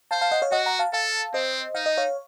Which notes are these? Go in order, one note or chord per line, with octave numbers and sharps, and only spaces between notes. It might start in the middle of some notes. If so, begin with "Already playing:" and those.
C5 F5 A5
F5 A5
D#5 F#5
C#5 F5
F#4 D#5 F#5
F#5 A#5
F5 A5
A4 F5 A5
C4 C5 D#5
D#4 F5
D#5
C#5 F5